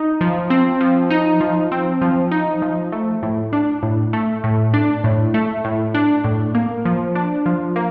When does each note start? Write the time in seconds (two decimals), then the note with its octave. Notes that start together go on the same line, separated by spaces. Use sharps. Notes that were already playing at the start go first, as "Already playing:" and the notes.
Already playing: D#4
0.21 F3
0.50 C4
0.81 F3
1.10 D#4
1.41 F3
1.72 C4
2.02 F3
2.31 D#4
2.62 F3
2.92 A3
3.23 A2
3.53 D4
3.83 A2
4.13 A3
4.44 A2
4.74 D4
5.04 A2
5.34 A3
5.65 A2
5.94 D4
6.24 A2
6.54 A#3
6.85 F3
7.15 D4
7.46 F3
7.76 A#3